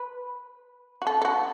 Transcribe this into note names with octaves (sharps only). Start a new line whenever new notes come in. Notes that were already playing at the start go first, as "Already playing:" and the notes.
Already playing: B4
F#4
A4
A4
F#4